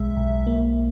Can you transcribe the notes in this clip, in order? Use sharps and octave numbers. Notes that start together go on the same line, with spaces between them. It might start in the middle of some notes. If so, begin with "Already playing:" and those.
Already playing: B1 G#3 E5
B1
A#3